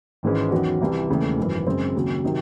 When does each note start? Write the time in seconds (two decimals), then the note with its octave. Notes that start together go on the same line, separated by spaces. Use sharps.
0.23 G#1 G#2 E3 G#3 C#4
0.51 E2 D#3 F#3 C#4 F#4
0.81 C2 C3 E3
1.09 E1 D#2 C#3 E3 A3
1.38 G#1 F#2 E3
1.66 F#2 C#3 G#3 C4
1.95 D#2 C#3 F#3
2.24 C3 D#3 F#3